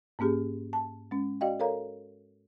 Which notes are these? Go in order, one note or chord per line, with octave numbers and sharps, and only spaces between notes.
G#2 A#3 C#4 G4 G#4
A5
G#3 C#4
F#4 D5 D#5 F5 G5
A4 A#4 C#5 F5 A#5